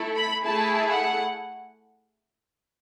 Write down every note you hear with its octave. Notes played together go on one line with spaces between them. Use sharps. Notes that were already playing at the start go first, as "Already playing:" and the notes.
Already playing: A3 E4 A4
B5
A3 E4 G#4 A5
F#5